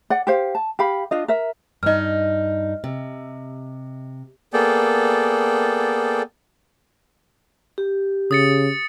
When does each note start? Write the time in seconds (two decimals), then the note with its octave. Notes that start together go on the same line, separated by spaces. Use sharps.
0.10 D5 F#5
0.27 G4 C5 F5
0.55 A5
0.79 G4 F5 B5
1.11 D4 F4 D#5
1.28 A#4 E5
1.83 G2 D#4 D#5 F6
2.84 C3
4.53 A#3 B3 G#4 A4 D5 G5
7.78 G4
8.31 C#3 D#6 A6 C#7